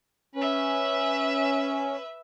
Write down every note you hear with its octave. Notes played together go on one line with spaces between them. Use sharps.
C#4 B4 E5